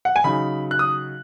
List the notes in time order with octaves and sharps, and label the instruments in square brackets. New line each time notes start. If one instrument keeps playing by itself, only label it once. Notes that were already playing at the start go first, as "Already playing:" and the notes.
[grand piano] F#5
G#5
C#3 F#3 D#4 B5
F#6
D#6